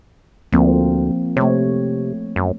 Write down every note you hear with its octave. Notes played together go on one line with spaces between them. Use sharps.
D2 F3 A#3 C4
C3 A3 C#5
F#2